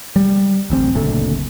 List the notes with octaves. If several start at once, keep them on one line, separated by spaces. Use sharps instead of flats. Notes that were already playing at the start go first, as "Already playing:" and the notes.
G3
D1 A1 C4
F#1 D2 A#2 A3